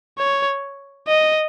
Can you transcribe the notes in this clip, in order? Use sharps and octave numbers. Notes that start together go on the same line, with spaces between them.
C#5
D#5